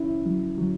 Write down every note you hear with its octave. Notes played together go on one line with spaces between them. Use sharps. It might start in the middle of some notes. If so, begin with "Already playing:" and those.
Already playing: C#4 E4
F#3
F#3